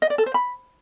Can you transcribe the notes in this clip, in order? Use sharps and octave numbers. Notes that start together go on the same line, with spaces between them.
D#5
D5
A4
C5
B5